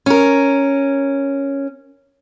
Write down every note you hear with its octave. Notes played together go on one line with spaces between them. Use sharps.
C#4 A#4